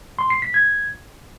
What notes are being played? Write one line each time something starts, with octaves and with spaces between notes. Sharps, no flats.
C6
C7
B6
G#6